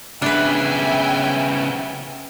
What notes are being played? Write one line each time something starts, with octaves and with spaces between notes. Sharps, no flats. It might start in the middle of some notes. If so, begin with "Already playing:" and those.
C#3 B3 D4 B4 E5 G5 G#5